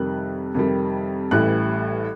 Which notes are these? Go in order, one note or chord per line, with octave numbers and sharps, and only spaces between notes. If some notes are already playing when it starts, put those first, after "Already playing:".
Already playing: F2 C3 D#3 G3 F#6
F2 C3 D#3 G3
A1 A2 E3 G3 F#6